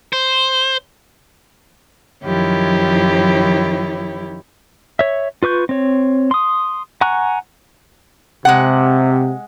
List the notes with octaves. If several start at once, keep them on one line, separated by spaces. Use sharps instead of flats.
C5
F#2 D#3 F3 E4 G4 C#5
C#5 E5
F4 B4 C#6 G6
C4 C#5
C6 D#6
F#5 G#5 A#5 C#6 F#6
C3 G#3 F#5